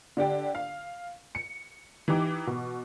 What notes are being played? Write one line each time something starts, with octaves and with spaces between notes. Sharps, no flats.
D3 D4 G4 G5
F5
C#7
E3 D#4 G4 D6
B2